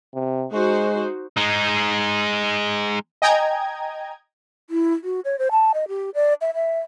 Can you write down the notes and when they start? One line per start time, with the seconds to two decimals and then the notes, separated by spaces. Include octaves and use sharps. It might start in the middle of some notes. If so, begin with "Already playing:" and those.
0.14 C3
0.52 G#3 D#4 F#4 C5
1.37 G#3 D#4
3.22 D#5 G5 G#5 A#5 G#6
4.70 E4
5.04 F#4
5.25 C#5
5.39 C5
5.51 A5
5.74 D#5
5.88 G4
6.15 D5
6.41 E5
6.54 E5